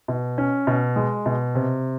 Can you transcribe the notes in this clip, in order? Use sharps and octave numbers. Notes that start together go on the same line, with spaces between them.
B2
C#4
B2
G#3
B2
C3